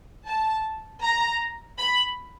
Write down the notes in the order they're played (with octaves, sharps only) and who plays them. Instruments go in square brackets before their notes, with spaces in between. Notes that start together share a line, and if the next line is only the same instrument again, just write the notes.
[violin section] A5
A#5
B5